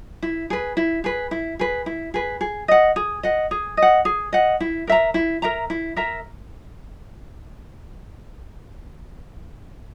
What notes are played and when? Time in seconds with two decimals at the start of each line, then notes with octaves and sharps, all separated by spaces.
0.23 E4
0.50 G#4 B4
0.77 E4
1.04 G#4 B4
1.31 E4
1.59 G#4 B4
1.86 E4
2.14 G#4 B4
2.41 G#4
2.68 D#5 F#5
2.96 G#4
3.23 D#5 F#5
3.51 G#4
3.77 D#5
3.82 F#5
4.05 G#4
4.33 D#5 F#5
4.60 E4
4.87 A#4 E5 A#5
5.14 E4
5.42 A#4 E5 A#5
5.70 E4
5.96 A#4 E5 A#5